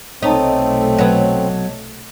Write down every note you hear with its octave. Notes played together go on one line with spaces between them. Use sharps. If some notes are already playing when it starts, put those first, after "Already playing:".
B1 C3 A3 C4 D#4 C#5 D#5 A5
F#3 B3